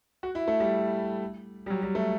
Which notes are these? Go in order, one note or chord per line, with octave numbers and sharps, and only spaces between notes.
F#4
E4
A3
G3
G3
F#3
G3
A3